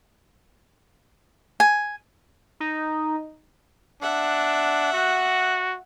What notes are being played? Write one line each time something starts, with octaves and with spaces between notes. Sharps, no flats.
G#5
D#4
D4 E5 F#5
F#4